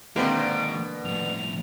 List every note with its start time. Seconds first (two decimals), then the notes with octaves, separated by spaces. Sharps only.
0.16 B2 D3 D#3 G#3 A#3 C4 B5 D7
1.05 F2 A2 F7